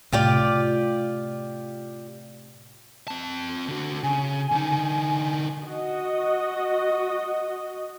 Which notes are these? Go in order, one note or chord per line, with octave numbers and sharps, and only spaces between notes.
A2 C3 F4 G4 D5
C4 A5
D3 F#4
C#3 G#5
D3 D#4
F#4 D#5